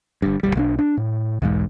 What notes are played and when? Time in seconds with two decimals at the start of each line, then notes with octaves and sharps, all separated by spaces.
0.22 G1 G2
0.43 D1 C#2 G3
0.55 B1 G#3 D4
0.79 D4
0.97 A2
1.42 B1 E2 G#2